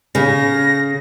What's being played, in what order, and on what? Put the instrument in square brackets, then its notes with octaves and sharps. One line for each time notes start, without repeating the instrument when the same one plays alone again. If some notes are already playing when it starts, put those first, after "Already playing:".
[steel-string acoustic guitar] C#3 [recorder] A#6